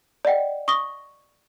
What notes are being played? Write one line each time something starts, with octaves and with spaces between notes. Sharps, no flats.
D5 D#5 F#5 G5
C#6 D#6 A#6 G7